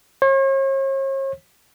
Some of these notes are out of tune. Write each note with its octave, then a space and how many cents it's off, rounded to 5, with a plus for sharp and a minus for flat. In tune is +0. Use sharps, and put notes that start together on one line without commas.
C#5 -45